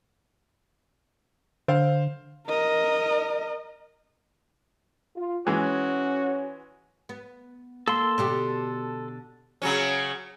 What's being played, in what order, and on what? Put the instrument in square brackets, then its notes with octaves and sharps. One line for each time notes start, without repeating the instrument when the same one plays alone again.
[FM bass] D3 [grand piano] C5 F5
[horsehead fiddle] A#4 D#5
[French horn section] F4
[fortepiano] E3 G#3 [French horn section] C#4 [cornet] F#4
[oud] B3
[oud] A#3 [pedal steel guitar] A4 C6
[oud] B2 D3 G4
[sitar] C#3 F#3 C#4